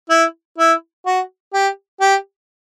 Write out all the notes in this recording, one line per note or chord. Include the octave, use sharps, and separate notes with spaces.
E4
E4
F#4
G4
G4